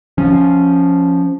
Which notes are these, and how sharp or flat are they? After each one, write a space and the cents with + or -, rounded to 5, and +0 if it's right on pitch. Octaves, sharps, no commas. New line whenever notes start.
F3 +0 C#4 +0